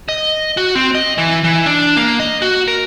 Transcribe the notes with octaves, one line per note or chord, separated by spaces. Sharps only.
D#5
F#4
C4
D#5
E3
E3
D4
A#3
D#5
F#4
A#4